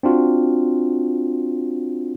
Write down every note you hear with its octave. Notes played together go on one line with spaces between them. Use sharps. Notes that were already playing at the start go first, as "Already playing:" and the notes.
C4 D4 F4 F#4